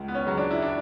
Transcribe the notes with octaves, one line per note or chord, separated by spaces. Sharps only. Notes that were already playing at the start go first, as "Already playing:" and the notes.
Already playing: C#2
B3
C#4
C#3 F#3
D4
E4
D4